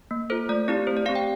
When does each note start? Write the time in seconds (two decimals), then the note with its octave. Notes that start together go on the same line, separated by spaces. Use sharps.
0.11 A#3
0.30 F4 A4 C5
0.49 A3 D5
0.68 C4 E4 G4 D5
0.87 A3 C5
0.97 D5
1.06 C4 G4 F5
1.15 G5